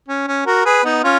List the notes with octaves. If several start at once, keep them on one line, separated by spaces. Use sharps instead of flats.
C#4
C#4
F#4 A#4
G#4 B4
B3 D#4
C#4 F4